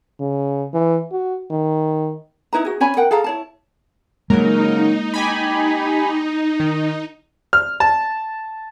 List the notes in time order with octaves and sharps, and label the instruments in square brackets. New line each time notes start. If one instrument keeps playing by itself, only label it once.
[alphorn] C#3
E3
F#4
D#3
[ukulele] D#4 E4 B4 A#5
F#4 G#4
C#4 C#5 G#5 B5
A#4 F#5 G5
G#4 A4 F5 A#5
E4 C#5 A5
[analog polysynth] C#3 F#3 A#4 [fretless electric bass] G#3 A#3 [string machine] D#4
[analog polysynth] G4 G#5 B5
D#3
[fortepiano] F6
A5